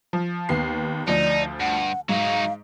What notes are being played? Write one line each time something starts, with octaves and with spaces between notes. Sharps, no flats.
F3
D#2 B3 C7
D2 F3 D#4 D5
G2 F#5
G#2 F#3 D#4 F5